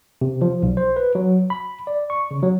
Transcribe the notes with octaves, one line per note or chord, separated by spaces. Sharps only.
C3
F3
B1
C5
B4
F#3
B5
D5
C#6
C#3
F#3